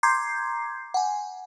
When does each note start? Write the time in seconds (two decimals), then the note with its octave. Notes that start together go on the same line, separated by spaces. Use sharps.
0.03 A#5 C6 D6 G6 G#6 C7
0.94 F#5 G#5